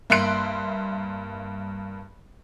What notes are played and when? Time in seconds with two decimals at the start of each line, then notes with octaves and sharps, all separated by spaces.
0.10 G2 A#3 E5 C6 F#6 D7